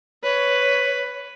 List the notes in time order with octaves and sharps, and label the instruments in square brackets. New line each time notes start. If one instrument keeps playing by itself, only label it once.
[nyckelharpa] B4 [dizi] C#5